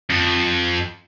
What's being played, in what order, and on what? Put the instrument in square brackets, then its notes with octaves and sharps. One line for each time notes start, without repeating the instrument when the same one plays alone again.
[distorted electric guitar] F2